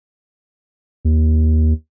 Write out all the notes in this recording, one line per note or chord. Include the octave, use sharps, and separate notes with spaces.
D#2